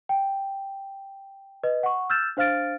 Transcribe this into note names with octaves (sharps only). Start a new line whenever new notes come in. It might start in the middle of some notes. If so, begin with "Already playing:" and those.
G5
B4 D#5
F#5 C#6
E6 F6 G6 A6 E7
D4 C5 F5 F6 A6 D7